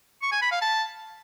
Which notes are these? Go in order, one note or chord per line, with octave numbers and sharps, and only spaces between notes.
C#6
G#5
B5
F5
A5